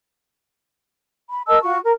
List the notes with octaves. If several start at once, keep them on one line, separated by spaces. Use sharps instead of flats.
B5
A#4 D#5 A5 E6
F4 F#4 C#6
A#4